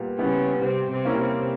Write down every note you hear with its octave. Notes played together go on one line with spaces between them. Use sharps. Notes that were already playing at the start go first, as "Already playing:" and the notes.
Already playing: A#2 G3 B3
C#3 G3 B3 C#4 E4
C3 G3 C4
C3 C4
A#3 C#4 E4
C3 C4